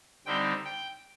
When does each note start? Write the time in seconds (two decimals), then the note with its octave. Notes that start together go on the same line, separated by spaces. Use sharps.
0.26 D3 G3 C4 D#4 G5
0.65 G5